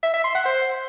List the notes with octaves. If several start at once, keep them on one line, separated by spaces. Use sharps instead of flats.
E5
E5
C6
F#5
C5